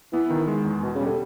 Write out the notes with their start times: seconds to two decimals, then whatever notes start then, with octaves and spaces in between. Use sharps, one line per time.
0.13 E3 B3
0.30 D#3
0.48 G#3
0.65 E2
0.83 B2
0.95 C#3
1.01 G3
1.06 D3